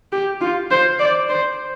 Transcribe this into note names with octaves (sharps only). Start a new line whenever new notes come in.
G4
F4
C5
D5
C5